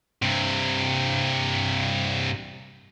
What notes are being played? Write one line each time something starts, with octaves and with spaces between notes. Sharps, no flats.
G2 C3